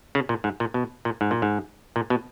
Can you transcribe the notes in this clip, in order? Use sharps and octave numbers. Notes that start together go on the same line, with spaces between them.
C#3
A#2
G#2
A#2
B2
A#2
G#2
A#2
G#2
A#2
B2